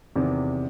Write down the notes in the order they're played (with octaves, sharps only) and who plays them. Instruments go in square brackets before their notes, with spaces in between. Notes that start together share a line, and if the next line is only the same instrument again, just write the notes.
[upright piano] E2 C3 D#3